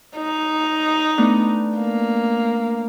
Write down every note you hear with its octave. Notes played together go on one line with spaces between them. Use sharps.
D#4
A3 B3 D4
A#3